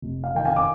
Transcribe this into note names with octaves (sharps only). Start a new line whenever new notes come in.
F1
F5
D#3 G5
F5 G#5
D6